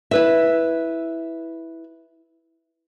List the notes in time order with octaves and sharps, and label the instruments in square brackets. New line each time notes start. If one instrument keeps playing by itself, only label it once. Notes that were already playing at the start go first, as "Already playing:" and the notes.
[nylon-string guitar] E4 B4 E5